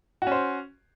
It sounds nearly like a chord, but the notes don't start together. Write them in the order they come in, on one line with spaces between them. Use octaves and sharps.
F#4 C#4 C5